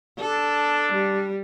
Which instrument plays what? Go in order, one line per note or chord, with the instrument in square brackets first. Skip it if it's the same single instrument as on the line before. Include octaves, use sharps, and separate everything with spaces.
[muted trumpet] D4 [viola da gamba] A4
[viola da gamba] G3